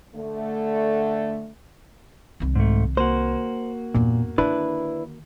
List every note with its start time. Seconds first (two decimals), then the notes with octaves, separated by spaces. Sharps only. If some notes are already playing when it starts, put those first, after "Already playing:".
0.15 D3 A3
2.40 C2 D#3
2.55 G#2 A3
2.97 A#3 F#4 C5
3.94 E2 G2 A#2
4.38 D3 D#3 D4 E4 B4